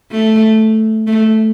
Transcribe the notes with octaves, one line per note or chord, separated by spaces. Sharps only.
A3
A3